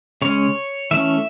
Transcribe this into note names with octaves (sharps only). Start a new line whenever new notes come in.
C#3 G#3 C#4 C#5
E3 A3 C#4 E5